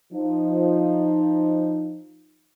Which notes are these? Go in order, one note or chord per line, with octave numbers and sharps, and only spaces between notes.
F3 D#4